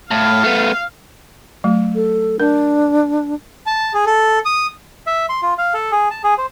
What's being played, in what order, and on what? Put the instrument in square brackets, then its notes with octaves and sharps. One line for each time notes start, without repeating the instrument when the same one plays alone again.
[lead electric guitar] A2 [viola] F5
[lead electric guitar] A3 B3
[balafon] F#3 A3
[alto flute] A4
[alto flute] D4 [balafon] A#4
[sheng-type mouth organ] A5
G#4
A4
D#6
[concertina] E5
C6
F4
F5
A4
G#4
A5
G#4
C5